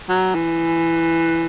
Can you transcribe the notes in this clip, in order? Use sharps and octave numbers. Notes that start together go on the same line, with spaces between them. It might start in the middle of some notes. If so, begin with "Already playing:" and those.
F#3
E3